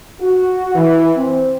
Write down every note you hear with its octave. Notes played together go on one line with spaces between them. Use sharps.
F#4
E3
C4